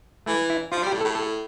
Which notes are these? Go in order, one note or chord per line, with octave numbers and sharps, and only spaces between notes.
E3 A3
E4
F3 F4
G3
G4
A2
A4
A2
A4